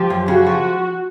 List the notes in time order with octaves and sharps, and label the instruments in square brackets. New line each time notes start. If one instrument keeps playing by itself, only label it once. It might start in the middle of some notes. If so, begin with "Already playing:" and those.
Already playing: [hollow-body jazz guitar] F3 [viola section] G4
[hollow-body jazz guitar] F#2
[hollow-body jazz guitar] C#3 [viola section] F#4
[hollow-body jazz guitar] F3